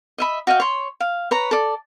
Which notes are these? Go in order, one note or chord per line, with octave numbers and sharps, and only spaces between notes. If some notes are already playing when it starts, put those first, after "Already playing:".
D#5 E5 B5
F#4 D#5 F5 G5
C#5 C6
F5
B4 C#5 A#5
A4 D5